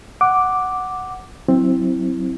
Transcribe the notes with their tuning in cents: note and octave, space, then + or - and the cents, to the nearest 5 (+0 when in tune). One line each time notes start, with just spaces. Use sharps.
F#5 +0 D6 +0
F#3 +0 C4 +10 E4 +0